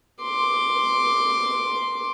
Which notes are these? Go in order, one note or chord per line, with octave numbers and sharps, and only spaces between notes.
C6 D6